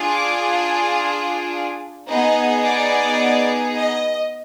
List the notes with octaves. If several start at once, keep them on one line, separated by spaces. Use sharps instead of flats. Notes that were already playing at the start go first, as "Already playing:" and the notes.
Already playing: D4 F4 G#4
D6
B3 D#4 G#4 D#5
D5
D#5